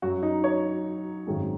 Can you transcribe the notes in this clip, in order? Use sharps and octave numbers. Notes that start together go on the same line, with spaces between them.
F#2 F#3 F#4
D#4
C#5
G#1 F#2 D#3 G#3